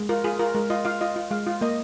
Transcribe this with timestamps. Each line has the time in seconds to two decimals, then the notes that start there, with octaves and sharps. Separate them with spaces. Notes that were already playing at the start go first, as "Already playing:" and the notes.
Already playing: G#3
0.09 F4 A#4
0.24 F4 G#4
0.39 F4 A#4
0.55 G#3 A#4
0.70 F4 D#5
0.85 F4 F5
1.01 F4 D#5
1.16 F4
1.31 G#3 F5
1.46 F4
1.61 A#3 D#5